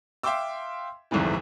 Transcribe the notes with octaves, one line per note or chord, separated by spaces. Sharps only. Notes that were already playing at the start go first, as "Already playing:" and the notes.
E5 F5 G5 C6 D6 E6
G1 C2 F2 G#2 C3 E3